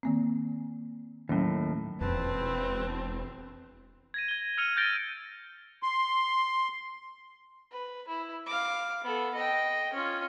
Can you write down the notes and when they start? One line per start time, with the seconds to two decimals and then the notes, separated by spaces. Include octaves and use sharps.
0.03 D#3 A#3 C4
1.29 D#2 A2 F#3 C#4
2.01 E1 F2 C4 B4 A5
4.14 G#6 A#6 D#7
4.28 G#6 G7
4.58 E6 F6 G#6 C#7 D#7 F7
4.77 G6 A6 A#6 C#7 D7 G7
5.83 C6
7.71 B4
8.08 E4
8.46 F5 D6
9.04 B3 A4
9.35 D#5 G5
9.93 C#4 F4